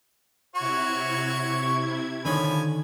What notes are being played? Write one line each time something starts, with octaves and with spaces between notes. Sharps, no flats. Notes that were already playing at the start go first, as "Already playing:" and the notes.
C3 E4 F#4 C#5 C#6 G#6
D3 D#3 F3 C#5 G#5 B5